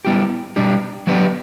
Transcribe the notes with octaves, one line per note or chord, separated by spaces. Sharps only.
G3 B3 E4 G4
B2 G3 D4 G4
F#3 B3 D4 G4 B4